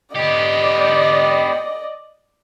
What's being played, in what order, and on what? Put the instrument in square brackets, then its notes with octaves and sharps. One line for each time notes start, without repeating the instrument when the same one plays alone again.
[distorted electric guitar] B3 G4 [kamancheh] D5 D#5